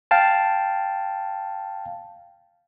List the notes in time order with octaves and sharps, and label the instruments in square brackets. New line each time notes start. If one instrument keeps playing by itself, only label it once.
[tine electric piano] F5 G5 A5